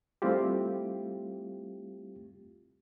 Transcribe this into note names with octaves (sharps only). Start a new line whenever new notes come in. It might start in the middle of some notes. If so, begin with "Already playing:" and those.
G3 A3 C4 E4 F4 G4